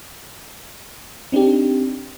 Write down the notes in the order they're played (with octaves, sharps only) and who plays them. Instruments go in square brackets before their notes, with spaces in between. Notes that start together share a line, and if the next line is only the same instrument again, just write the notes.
[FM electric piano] C4 D4 D#4 G4